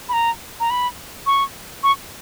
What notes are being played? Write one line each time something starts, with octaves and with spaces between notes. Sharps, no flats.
B5
A#5
A#5
B5
C#6
C#6